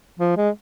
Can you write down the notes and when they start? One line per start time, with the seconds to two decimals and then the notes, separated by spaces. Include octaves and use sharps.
0.20 F3
0.37 G#3